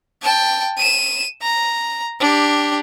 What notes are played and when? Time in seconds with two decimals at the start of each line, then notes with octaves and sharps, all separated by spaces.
0.22 G5 A5
0.77 D#7 E7
1.42 A#5
2.20 D4 G4